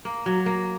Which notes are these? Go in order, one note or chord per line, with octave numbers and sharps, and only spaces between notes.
A#3
F#3
A#3